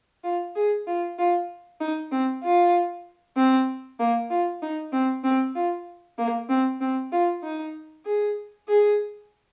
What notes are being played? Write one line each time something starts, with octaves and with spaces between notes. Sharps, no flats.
F4
G#4
F4
F4
D#4
C4
F4
C4
A#3
F4
D#4
C4
C4
F4
A#3
C4
C4
F4
D#4
G#4
G#4